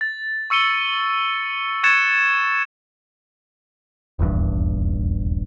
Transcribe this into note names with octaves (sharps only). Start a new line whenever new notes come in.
A6
C#6 E6 C#7 D#7 G7
C#6 F#6 G#6 A6 C#7 E7
D#1 A#1 E2 G2